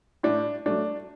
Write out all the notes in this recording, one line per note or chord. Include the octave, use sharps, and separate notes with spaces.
A2 D4
F#3 A3 D4